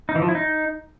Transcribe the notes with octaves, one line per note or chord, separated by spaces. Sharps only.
D#4
E3
F3
E4
D#4